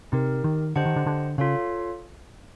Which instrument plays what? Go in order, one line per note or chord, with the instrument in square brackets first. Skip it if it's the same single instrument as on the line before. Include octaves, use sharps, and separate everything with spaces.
[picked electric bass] C3 [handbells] D#4 G4 A#4
[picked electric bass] D#3
[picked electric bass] D3 [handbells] G4 C5 D#5 F#5 A5
[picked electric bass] D#3
D3
D3
[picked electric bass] C#3 [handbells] F4 A4 C#5 F5